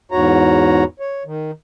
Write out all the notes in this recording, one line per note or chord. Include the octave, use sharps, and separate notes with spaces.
E2 G#2 F#4 C#5 A#5
C#5
D#3